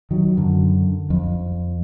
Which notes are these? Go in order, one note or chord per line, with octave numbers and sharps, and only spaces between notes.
D#3 F#3
F#2 D3
F2